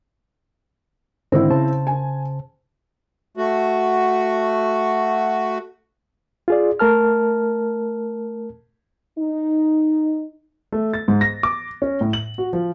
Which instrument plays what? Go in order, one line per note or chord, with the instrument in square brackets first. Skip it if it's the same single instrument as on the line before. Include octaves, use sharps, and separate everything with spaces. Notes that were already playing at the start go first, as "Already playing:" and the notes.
[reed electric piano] G#2 D3 D#3 [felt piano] C4 E4
[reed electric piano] C#3 C5 A5
[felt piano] G#5
[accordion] A3 F#4
[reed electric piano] F4 G#4 D5
A3 A#4 A5 F6
[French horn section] D#4
[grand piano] A3
A6
G#2
A#6
D6
C#4
A2
F#7
F#4
F3